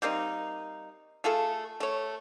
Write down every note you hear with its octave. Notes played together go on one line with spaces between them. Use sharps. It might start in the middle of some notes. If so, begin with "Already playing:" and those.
G3 A#3 C4 D#4
A3 F4 G#4 A4
A3 C#5